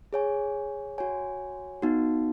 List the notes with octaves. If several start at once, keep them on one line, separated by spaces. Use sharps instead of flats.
G#4 C#5 G#5
F#4 C#5 G#5
B3 D#4 F#4